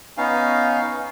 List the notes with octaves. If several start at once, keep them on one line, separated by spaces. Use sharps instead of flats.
B3 C#4 D#4 F5